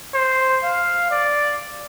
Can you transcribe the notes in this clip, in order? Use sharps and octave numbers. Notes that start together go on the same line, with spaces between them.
C5
F5
D5